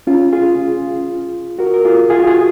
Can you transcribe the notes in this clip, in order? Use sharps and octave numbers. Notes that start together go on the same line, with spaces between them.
C#4 F4
F4 G#4
F#4 A#4
A#4
F4 G#4
F4 G#4
F#4
F4 G#4